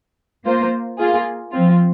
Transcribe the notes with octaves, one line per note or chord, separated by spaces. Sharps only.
A#3 F4 C5
A#3 F4 G#4
F3 C4 F4